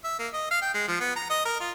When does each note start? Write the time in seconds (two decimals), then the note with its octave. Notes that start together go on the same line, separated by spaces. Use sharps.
0.04 E5
0.19 A#3
0.33 D#5
0.51 F5
0.62 G5
0.74 G#3
0.88 F3
1.00 B3
1.16 A#5
1.30 D#5
1.45 A#4
1.60 F4